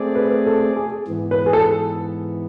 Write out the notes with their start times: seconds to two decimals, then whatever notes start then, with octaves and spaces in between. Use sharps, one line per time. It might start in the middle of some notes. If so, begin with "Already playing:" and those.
Already playing: A3 C4 G#4 D5
0.15 B4
0.47 A4
0.76 G#4
1.08 G#2 E3 B3
1.31 B4
1.46 G#4
1.53 A4